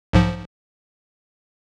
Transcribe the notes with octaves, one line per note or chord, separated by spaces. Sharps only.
B1 G#2 F3